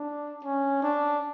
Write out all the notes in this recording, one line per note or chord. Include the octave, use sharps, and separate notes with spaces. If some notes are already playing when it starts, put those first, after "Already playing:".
Already playing: D4
C#4
D4